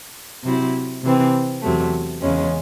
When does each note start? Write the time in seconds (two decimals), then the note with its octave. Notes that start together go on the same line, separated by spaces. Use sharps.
0.43 C3 F#3 C4 E4
1.03 C3 E3 C4
1.62 E2 C3 F#3 A3
2.21 E2 C#3 G#3 C#4